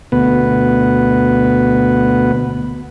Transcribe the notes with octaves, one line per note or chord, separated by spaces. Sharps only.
D2 B2 B3 B4